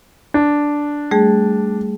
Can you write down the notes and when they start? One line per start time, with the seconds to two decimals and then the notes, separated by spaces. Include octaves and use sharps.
0.34 D4
1.11 G3 A3 G#4